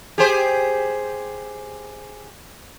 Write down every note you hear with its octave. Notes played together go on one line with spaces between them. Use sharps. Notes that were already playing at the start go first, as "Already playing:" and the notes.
G4 G#4 C5